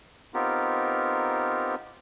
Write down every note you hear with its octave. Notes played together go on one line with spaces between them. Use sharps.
B3 C4 D#4 F4 G4 A#4